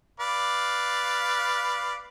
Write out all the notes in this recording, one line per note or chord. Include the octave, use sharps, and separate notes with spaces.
B4 D5 F5